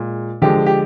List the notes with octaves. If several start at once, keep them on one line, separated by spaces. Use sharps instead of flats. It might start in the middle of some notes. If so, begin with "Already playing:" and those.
Already playing: A#2 G#3
D3 F3 G#3 G4
G4